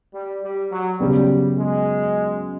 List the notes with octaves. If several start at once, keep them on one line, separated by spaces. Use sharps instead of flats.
G3
G3
F#3
C#3 F#3 G3 B3
G#3